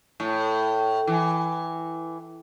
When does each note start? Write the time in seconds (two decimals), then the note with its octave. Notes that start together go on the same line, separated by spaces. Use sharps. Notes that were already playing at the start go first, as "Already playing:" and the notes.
0.20 A2
1.07 E3